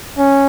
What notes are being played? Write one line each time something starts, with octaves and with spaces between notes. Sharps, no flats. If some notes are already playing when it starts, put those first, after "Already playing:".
C#4